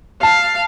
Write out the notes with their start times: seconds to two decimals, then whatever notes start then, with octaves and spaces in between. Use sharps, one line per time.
0.22 F5 A5